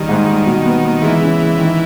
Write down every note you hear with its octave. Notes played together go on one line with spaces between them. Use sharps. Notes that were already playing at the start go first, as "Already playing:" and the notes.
Already playing: D#3 G3
G#2
G3
B2
B3
B3
E3 G#3
C#3
G#3
D#3